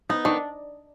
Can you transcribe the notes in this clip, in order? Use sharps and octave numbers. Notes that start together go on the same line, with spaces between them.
B3 D#4
D#3 D4